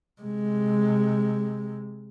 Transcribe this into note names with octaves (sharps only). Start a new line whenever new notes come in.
C3 G#3